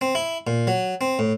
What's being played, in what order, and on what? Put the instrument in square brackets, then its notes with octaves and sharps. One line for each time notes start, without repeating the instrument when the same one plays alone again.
[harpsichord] C4
E4
A#2
F#3
C4
A2